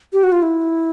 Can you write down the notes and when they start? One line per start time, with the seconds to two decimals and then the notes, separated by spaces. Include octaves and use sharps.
0.13 G4
0.23 F#4
0.32 F4
0.42 E4